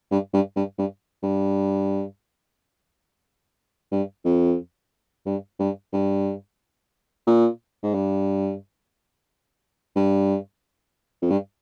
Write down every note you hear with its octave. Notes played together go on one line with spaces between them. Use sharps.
G2
G2
G2
G2
G2
G2
F2
G2
G2
G2
A#2
G#2
G2
G2
F2
G2